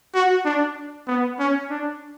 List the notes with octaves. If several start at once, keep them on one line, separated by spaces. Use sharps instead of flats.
F#4
D4
B3
C#4
D4